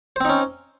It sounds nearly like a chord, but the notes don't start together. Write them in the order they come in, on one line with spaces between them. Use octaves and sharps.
C5 C4 D#4 C#4